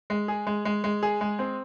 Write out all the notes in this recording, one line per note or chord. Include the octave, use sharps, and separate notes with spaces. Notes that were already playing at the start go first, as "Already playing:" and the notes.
G#3
G#4
G#3
G#3
G#3
G#4
G#3
C4